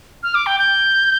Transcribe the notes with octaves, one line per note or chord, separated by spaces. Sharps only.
F6
D6
G5
G6